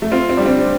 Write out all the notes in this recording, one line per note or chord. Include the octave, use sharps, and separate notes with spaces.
A3
C4 F4
C4
G3 D4
C4